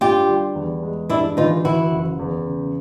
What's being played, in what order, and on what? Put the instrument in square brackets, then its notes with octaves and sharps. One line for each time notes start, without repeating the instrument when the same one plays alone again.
[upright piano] G2 [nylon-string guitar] F4 G4
[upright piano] G3
E2
G#3
[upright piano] G2 [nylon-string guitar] D4 E4
[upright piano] E3 [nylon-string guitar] D#4 F4
[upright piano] E3 [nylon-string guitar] E4 F#4
[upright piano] F#1
E2
C#3